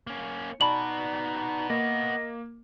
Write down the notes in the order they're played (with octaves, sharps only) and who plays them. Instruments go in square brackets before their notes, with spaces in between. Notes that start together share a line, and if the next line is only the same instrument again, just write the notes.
[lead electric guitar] A#3 C#4
[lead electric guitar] B3 F#4 [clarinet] D#4 [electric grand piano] D5 A5 [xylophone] B5 F#7
[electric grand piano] A#3 [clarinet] D#5